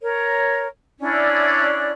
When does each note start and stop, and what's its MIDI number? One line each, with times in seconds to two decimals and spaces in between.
0.01 0.66 70
0.01 0.66 73
1.00 1.91 61
1.00 1.91 62
1.00 1.91 64
1.00 1.91 74